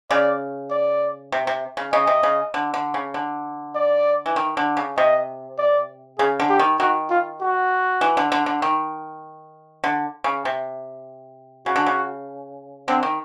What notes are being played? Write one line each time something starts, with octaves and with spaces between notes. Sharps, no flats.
C#3 D5
D5
C3
C3
C#3
C#3 D#5
C3
C#3
D3
D3
C#3
D3
D5
E3
D#3
D3
C#3
C3 D#5
D5
C#3 G#4
D3
G4
D#3
D#3 F#4
F4
F#4
E3
D3
D3
D3
D#3
D3
C#3
C3
C#3 F#4
D3
C#3
D3 C4
D#3